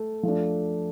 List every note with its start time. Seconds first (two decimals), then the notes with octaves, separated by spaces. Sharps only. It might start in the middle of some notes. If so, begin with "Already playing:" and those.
Already playing: A3
0.23 F3 A3 D4